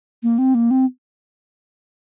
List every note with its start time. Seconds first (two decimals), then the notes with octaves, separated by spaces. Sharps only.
0.23 A#3
0.38 C4
0.55 A#3
0.71 C4